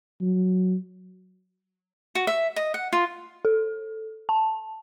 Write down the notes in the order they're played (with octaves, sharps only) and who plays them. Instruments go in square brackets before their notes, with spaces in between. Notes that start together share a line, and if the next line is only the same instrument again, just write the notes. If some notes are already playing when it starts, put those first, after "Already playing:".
[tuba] F#3
[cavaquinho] F#4
E5
D#5
F#5
F4
[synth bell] A4
A5